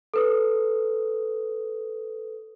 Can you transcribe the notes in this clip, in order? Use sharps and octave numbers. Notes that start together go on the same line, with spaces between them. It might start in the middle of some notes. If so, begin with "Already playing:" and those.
A4 B4 D#6